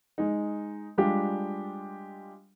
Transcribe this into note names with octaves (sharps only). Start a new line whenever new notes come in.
G#3 D#4
G3 G#3 D4 F4 G4 D5